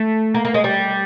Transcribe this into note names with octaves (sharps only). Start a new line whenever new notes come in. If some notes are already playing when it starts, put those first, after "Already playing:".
Already playing: A3
A#3
A#3
G#3
G3